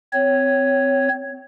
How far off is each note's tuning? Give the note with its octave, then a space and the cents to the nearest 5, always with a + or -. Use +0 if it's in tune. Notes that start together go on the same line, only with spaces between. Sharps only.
C4 -20 C#5 +0